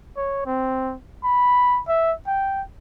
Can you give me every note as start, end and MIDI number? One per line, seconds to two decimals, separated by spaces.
0.17 0.44 73
0.46 0.94 60
1.24 1.80 83
1.88 2.13 76
2.27 2.62 79